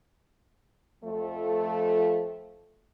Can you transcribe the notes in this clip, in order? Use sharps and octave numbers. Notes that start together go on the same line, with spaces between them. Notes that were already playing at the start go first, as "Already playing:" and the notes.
F2 F3 A3